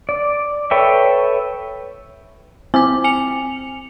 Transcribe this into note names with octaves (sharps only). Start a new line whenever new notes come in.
D5
A4 B4 C#5 E5 G5
C4 E4 G#5 D6
G#5 C#7 F7